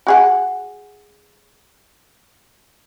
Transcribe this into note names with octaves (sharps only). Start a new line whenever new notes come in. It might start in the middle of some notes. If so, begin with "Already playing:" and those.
F#4 G#4 F#5